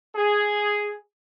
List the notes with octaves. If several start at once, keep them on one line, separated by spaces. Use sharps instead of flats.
G#4